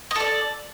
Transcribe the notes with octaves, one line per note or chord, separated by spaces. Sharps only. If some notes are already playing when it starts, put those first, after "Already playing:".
A4 D5 D#5